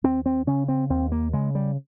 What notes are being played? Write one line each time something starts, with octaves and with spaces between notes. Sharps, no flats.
D#2 C4
C4
C#3 C#4
C4
D#2 C4
A#3
C#3 G#3
G3